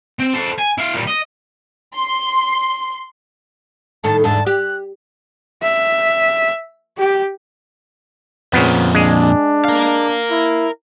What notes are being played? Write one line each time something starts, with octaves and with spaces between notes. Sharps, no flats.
C4
A4 C5
G#5
E4 F5
A#2 G3
D#5
C6
A2 D#3 A4 A5
E2 G#2 D3 A5
G4 F#6
E5
G4
F2 A#2 C#3 F3 B3
G#3 D4 G#4
A#4 F5
E4